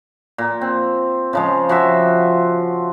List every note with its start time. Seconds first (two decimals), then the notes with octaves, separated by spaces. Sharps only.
0.38 A#2
0.61 C4
1.33 C#3 F3 G#3
1.69 F3 F#4 E5